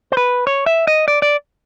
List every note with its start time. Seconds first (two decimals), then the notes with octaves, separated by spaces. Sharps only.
0.12 C5
0.17 B4
0.47 C#5
0.66 E5
0.87 D#5
1.08 D5
1.22 D5